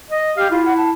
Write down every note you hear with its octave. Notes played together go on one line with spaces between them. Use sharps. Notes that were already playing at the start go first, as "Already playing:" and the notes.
D#5
G4 F5
E4 F4
F#5
A5